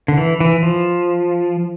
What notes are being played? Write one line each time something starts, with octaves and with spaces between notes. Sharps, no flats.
D3
E3
E3
F3